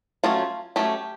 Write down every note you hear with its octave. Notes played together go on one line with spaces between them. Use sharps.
F#3 A3 C#4 F4
F#3 A3 C#4 G4